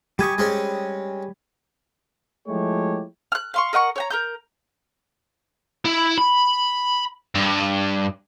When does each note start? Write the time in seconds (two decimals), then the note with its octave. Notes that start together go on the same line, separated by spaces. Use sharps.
0.19 G3 G4 G#5 C#6 D#6
0.38 G#3 C4 C#4
2.48 F3 G#3 A3 E4 G4 C#5
3.32 F6 F#6
3.54 F5 C6 C#6
3.73 A#4 D#5 F#5 C#6
3.96 C#5 G5 A#5
4.10 A#4 A#5 G6
5.85 E4
6.18 B5
7.35 G2